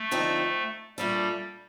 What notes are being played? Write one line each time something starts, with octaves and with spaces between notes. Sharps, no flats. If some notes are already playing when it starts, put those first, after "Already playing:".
Already playing: A3
D3 F3 C4 D#4 A4
A#2 G3 A3 D4 A4